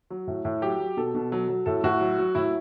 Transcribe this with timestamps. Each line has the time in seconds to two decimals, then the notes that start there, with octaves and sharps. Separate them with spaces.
0.10 F#3
0.27 A2
0.45 A2
0.62 F#3 G4
0.80 F#3
0.97 B2 A4
1.15 B2
1.32 F#3
1.48 F#3
1.66 A2 A4
1.84 A2 F#4
2.01 F#3
2.18 F#3
2.35 A2 E4